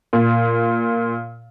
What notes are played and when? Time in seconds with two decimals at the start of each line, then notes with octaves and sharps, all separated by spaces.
0.13 A#2